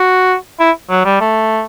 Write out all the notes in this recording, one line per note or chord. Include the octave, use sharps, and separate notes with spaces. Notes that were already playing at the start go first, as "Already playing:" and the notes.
Already playing: F#4
E4
F#3
G3
A3